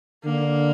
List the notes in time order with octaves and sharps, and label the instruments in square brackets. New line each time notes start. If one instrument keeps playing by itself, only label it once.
[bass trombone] D3 [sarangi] A#3